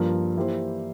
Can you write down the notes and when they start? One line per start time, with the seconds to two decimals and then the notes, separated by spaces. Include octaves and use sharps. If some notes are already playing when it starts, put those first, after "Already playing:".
Already playing: G2 F3 A#3 F4 A#4
0.36 E3 A#3 E4 G4 C5